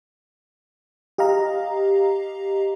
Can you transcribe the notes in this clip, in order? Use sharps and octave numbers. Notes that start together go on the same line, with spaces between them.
G4 D#5 F5 A#5